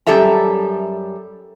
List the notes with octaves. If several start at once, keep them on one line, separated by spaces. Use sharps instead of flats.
F#2 G3 G4 A4 E5 A#5